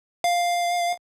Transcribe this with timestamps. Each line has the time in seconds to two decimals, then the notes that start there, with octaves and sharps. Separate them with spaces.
0.24 F5